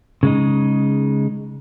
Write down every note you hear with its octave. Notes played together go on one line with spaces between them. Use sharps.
C#3 G#3 D#4